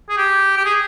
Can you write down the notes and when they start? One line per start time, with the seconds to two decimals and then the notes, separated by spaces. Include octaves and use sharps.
0.09 G#4
0.18 G4
0.57 G4
0.65 G#4